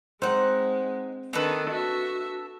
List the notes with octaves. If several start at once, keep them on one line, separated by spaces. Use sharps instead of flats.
G#3 C4 D#4 F#5
D#3 D4 A4 B4
F#4 E5